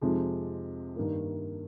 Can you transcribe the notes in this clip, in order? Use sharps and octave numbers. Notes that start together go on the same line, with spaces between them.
F2 C3 F3 G#3 D#4
G2 D#3 A#3